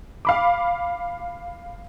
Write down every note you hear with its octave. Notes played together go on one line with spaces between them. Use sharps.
F5 B5 D6